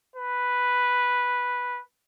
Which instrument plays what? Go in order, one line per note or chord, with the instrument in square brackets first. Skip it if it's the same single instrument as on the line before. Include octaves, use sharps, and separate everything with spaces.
[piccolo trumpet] B4